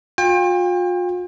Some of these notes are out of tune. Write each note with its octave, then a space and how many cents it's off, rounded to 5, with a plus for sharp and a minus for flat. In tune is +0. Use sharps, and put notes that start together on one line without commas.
F4 +40 G5 +35